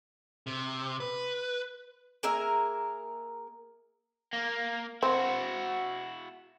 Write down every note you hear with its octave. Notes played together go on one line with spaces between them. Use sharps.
C3
B4
A#3 G#4 A#4 E5
A#3
C4 E4 F#4